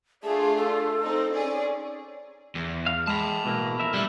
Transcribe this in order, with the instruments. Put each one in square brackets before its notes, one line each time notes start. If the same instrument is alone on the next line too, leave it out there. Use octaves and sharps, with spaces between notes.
[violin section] A3 D4 F4 [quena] G#4
[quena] A4
[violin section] C4 D#4
C#4 G#4 D5
[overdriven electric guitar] E2
[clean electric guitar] F5
[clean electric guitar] G#3 [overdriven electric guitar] A5 B5
[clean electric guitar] B2 E3 A#3
F2 A#4 E5
[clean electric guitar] D3 A3 E4 [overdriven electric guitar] G3